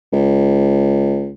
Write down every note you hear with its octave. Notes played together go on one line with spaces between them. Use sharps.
C#2